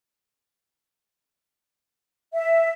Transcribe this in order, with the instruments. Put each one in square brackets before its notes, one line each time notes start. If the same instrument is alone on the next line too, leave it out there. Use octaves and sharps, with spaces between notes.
[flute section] E5